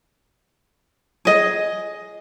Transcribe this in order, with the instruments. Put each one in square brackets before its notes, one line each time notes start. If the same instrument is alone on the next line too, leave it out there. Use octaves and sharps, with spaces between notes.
[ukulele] G#4 D#5